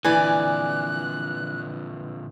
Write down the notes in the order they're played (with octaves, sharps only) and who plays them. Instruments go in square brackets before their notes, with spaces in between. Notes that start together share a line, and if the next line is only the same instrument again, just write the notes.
[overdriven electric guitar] A#2 D3 [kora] E3 [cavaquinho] D5 G#5 [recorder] F#6